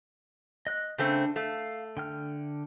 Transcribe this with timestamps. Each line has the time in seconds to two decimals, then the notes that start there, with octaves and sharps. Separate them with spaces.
0.67 D#5 F#6
0.98 C#3 A3 C4 D4
1.36 A3 F5
1.97 D3 G5 F6